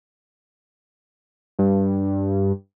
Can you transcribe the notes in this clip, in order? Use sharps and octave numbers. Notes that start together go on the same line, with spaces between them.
G2